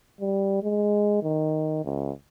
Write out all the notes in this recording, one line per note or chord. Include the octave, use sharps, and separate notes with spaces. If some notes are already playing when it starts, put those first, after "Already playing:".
G3
G#3
D#3
C#2